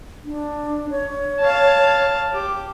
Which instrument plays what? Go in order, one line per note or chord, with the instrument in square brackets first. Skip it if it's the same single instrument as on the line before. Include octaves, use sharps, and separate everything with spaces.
[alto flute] D4
C#5
[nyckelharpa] F5 A5
G4 D6